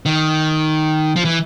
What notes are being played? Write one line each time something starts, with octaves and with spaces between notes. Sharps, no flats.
D#3
F3
E3